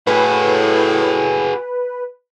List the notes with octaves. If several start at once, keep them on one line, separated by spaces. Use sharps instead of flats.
A2 F#4 G#4 B4